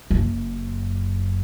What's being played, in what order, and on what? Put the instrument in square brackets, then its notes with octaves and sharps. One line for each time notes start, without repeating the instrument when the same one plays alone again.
[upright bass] F#1 F#2